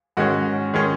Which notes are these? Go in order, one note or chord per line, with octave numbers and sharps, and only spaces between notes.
G#2 D#3 G#3 C#4 F#4
D#3 G#3 C#4